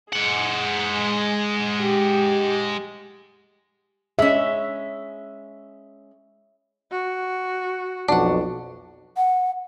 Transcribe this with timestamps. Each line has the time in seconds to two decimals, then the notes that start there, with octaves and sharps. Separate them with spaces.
0.13 G#3 G#4 F#5
1.81 G4
4.19 G#3 C#4 E5
6.91 F#4
8.08 B1 F2 D4 F#4 F#5
9.17 F#5